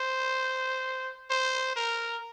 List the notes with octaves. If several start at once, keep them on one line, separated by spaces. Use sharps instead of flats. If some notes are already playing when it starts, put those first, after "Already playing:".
Already playing: C5
C5
A#4